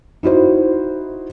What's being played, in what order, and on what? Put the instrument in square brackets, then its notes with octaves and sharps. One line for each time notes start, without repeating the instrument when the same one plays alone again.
[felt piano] D#4 E4 F#4 C5